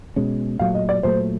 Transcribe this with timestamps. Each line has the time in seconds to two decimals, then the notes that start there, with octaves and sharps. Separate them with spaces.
0.16 B2 G#3 C#4
0.59 A#2 F#3 A3 F5
0.74 D#5
0.89 D5
1.03 A#2 F#3 A3 C5